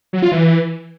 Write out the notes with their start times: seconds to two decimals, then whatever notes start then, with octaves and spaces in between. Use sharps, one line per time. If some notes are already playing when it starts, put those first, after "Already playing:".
0.13 F#3
0.22 F4
0.32 E3